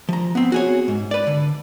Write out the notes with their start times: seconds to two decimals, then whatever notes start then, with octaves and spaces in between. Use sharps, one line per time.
0.09 F3 A#5
0.35 B3 C4
0.52 F#4 G#4 C#5
0.88 G#2
1.11 B4 D5
1.27 D3